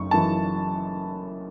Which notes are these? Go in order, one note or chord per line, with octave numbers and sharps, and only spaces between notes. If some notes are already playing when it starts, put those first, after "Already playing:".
Already playing: F#1 F#2 C#6
F#1 F#2 E3 A5